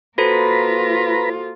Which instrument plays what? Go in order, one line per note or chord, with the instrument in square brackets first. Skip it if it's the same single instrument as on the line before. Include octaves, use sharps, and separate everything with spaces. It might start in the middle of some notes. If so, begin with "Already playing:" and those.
[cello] A#3 F4 [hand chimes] F#4 A4 C5 [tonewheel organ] B4 A#5 B5